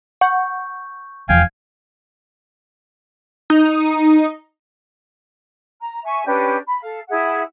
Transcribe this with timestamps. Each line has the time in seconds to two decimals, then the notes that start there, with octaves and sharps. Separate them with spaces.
0.21 F#5 C#6 G6
1.29 F1 E2 F3 F5 G5 G#5 G#6
3.50 D#4
5.81 A#5
6.04 E5 G#5 C#6
6.26 C#4 D4 G4 B4
6.67 B5
6.82 A4 F5
7.09 E4 G#4 E5 F#5